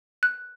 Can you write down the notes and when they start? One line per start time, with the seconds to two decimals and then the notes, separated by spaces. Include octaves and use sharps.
0.23 F#6